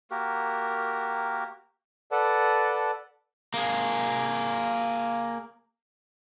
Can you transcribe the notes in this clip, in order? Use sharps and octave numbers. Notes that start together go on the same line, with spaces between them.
A#3 F#4 G4 A#4
A4 B4 D5 F#5 A5
A#3 G#4